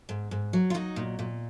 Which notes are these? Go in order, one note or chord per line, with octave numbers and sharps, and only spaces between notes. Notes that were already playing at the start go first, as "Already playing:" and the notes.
G#2
G#2
F#3
F4
F#3 D#4
A#2
A#2